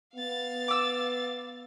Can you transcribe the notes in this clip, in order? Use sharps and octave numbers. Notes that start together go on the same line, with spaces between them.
B3 F5 A6
D6 E6